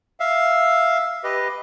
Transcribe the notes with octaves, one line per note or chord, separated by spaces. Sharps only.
E5 F5
G4 B4 D#5